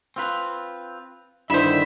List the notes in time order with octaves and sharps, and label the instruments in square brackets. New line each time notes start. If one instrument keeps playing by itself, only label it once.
[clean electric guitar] C4 F4 B4
[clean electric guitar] G2 D3 D#3 [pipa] E4 C5 [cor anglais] E5